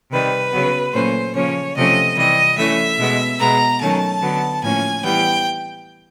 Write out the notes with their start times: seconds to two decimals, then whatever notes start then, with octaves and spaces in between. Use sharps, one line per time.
0.11 C3 D#3 G3 B4
0.52 C#3 F#3 B3
0.93 A#2 F#3 A3 C#4 C5
1.34 C#3 F3 A#3 C#4 C#5
1.76 C3 F3 A3 C#4 D#5
2.16 C3 E3 G3 D#5
2.57 E3 A3 C#4 E5
2.99 B2 G#3 B3
3.39 B2 G#3 B3 A#5
3.80 D#3 F#3 A3 C#4 A5
4.21 D3 F#3 B3
4.63 A2 F3 A#3 C#4 G#5
5.03 E3 G3 B3 G5